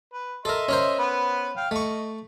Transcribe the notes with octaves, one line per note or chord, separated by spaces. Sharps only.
B4
A4 A#4 D#5 E5 C6
C#4 A#4 C5
B3 B4
F5 G5
A3 D#5 C#6